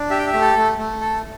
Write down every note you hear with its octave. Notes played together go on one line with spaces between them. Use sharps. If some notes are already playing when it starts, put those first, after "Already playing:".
Already playing: D4
G4 E5
G5
E5
A3
A4
A3
A3
A4